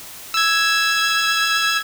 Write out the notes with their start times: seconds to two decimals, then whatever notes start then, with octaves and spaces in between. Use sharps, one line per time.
0.34 E6 G#6